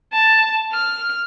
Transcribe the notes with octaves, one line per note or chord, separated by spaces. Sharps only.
A5
F6